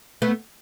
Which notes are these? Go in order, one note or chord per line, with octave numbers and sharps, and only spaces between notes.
A3 B3